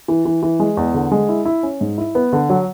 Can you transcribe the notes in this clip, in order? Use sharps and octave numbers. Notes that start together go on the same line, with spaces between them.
E3
E3
E3
G#3
E2
D3
G#3
E4
E4
C#4
G#2
E4
B3
D3
F#3